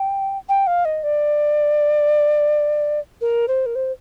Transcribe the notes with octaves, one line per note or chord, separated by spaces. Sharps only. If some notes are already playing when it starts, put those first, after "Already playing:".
Already playing: G5
G5
F5
D#5
D5
A#4
C5
A#4
C5